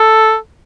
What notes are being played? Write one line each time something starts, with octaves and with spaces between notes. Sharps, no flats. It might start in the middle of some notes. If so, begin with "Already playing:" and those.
Already playing: A4